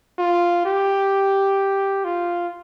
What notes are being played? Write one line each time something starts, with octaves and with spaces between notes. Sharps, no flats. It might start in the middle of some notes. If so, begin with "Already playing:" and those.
F4
G4
F4